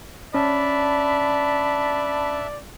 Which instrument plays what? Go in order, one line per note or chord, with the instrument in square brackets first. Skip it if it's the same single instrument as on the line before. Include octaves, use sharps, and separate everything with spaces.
[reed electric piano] C#4 [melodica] D4 E5 A5 [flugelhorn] D5 [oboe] B5